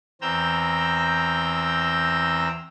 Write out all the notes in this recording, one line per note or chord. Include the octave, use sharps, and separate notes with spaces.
E2 C4 A#5 E6 G6